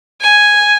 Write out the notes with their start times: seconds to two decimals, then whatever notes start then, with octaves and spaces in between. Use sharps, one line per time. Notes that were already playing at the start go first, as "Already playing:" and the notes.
0.21 G#5